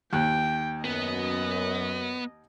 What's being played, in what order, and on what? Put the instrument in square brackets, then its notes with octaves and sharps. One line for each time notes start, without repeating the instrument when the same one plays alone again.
[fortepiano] D#2 F#6 [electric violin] G5
[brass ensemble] F#2 [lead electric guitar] B3 [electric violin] D#5